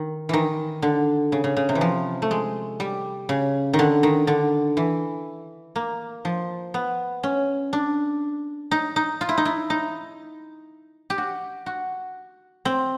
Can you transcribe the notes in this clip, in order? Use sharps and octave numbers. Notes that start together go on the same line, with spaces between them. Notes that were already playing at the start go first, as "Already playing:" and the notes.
Already playing: D#3
D#3 E3
D3
C#3
C#3
C#3
C3
E3
F3
A3
G#3
G3
C#3
D#3
D3
D#3
D3
E3
A#3
F3
B3
C#4
D4
D#4
D#4
F4
E4
D#4
E4
D#4
G4
F#4
F#4
C4